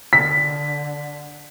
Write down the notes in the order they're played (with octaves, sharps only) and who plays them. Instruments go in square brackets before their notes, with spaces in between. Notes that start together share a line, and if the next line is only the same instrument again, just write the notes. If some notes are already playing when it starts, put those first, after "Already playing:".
[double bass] D3 [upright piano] B6